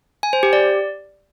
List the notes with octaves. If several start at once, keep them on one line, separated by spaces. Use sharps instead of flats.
G#5
C5
G4
D5